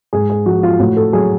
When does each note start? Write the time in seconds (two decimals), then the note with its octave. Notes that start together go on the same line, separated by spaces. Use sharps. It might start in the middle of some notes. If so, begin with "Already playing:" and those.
0.13 G#2 G#4
0.30 G#4
0.46 F3 F#4
0.63 F4
0.79 A2 F#4
0.97 A4
1.13 F#3 G#4